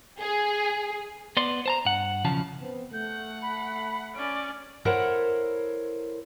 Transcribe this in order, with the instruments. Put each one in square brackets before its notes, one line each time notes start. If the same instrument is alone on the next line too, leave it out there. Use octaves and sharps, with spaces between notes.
[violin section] G#4
[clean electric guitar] B3 D5 C6
C5 A5 A#5
G2 F#5
B1 E2 C#3 F3 A5
[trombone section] B3 C4
[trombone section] A3 [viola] F#5 [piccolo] G6
[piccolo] B5
[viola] C#4 D5 [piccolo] D7
[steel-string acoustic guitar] E4 A4 A#4 C5 C#5 F#5